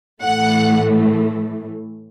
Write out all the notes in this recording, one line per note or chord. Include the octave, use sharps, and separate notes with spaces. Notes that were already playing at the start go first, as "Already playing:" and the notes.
A2 E3 A3 F#5